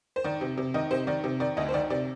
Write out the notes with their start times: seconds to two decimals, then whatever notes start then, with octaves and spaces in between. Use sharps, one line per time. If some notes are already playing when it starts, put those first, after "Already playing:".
0.16 C5
0.24 D#3 D5
0.41 C3
0.58 C3
0.74 D#3 D#5
0.91 C3 C5
1.07 D#3 D5
1.24 C3
1.40 D#3 D5
1.57 D2 D#5
1.69 C5
1.74 D#3 D5
1.90 C3 D5